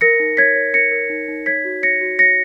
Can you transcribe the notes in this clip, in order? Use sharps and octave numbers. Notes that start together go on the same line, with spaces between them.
A#4 A#6 C#7
D#4
C#5 G#6 B6
C#5
A#4 A#6 C#7
A#4
D#4
D#4
C#5 G#6 B6
F#4
C#5 A#6 C#7
F#4
C#5 A#6 C#7